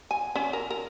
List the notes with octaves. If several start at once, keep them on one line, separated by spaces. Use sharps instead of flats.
G#5
C#4
A#4
A#4